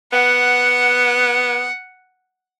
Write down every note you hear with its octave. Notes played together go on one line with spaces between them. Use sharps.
B3 F#5